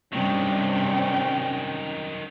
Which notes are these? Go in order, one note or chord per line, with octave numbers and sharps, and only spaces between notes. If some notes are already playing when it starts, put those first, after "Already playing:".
G2 C3 D#3 F#3 C#4 D4 G5